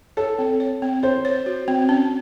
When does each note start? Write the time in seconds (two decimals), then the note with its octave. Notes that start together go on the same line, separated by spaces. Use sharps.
0.17 A4 C#5
0.39 C4
0.60 C#5
0.82 C4
1.03 C5 C#5
1.25 C#5
1.46 F#4
1.68 C4
1.89 C#4